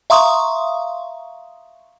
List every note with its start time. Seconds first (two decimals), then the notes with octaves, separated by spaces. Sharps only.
0.10 E5 F5 A#5 C6 C#6 D#6